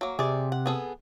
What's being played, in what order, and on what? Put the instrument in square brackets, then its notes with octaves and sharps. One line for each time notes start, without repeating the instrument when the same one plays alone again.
[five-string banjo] F#3 A#3
[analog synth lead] C3 [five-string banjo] G#4 D5
[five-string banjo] F#5
B3 G#4 A4